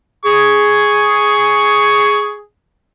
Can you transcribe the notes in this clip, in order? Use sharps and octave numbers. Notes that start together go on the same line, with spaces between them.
G#4 C#6